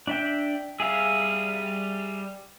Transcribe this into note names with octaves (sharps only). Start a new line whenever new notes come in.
D4 E5 G5
G3 G#4 E5 F5